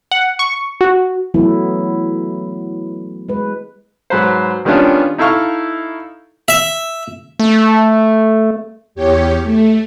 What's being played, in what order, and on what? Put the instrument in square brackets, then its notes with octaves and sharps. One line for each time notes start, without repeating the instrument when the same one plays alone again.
[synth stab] F#5
C#6
F#4
[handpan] E3 F#3 A3 B3 E4
G#3 B4
[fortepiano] G#2 F#3 B4 C5
D#3 G3 B3 C#4 D4 F4
D#4 E4 A4 F5 C#6 F6
[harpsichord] E5
[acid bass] A3
[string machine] E2 G4 C#5
A3